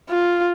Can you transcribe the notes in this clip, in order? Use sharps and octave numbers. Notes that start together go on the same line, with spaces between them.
F4